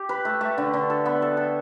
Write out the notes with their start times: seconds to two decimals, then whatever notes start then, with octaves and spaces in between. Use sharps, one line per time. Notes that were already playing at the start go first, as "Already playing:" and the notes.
Already playing: G4
0.09 B4
0.25 A3
0.41 A3
0.58 D3
0.73 D3
0.90 A4
1.06 B3
1.22 A4
1.37 A4